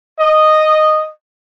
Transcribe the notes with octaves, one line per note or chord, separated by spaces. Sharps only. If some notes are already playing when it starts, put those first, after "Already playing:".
D#5